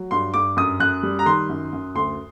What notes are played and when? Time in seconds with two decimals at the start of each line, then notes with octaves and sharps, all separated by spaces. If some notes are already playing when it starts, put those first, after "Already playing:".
Already playing: F#3
0.11 G2 C6
0.34 G2 D6
0.57 F#2 D#6
0.80 F#2 F#6
1.03 G3
1.19 A#5
1.26 D#3 C6
1.49 F#2
1.73 F#2
1.95 D2 C6